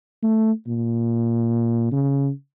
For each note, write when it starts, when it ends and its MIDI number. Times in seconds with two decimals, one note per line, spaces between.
0.23 0.52 57
0.67 1.88 46
1.92 2.30 49